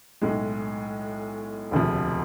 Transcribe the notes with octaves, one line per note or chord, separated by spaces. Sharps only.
B1 A2 G#3
E1 D2 C3 F3